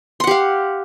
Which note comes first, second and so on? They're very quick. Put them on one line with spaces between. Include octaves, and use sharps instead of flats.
C6 F#5 G4 F5